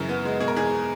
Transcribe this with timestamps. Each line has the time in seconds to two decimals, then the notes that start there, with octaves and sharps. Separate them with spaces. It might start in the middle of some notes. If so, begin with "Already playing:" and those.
Already playing: F#2 C#3 E3
0.09 B3
0.25 G#3
0.40 B2 G#4
0.48 A#4
0.56 E2 G#4